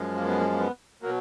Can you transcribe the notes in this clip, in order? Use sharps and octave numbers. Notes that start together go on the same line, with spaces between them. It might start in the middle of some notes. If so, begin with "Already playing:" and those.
Already playing: F#2 F3 G#3
A#3
B3
A#3
A#3
B3
B2 F#3 A#3